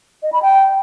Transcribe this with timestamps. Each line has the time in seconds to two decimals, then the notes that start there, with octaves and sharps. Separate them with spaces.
0.23 D#5
0.33 B5
0.42 G5